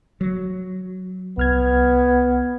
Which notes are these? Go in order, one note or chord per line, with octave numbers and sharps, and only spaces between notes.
F#3
C2 B3 F6 G#6